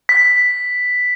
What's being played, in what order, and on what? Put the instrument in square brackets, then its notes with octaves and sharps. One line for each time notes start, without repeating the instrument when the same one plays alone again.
[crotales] B6